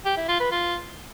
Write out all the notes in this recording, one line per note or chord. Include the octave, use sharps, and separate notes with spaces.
G4
E4
F4
B4
F4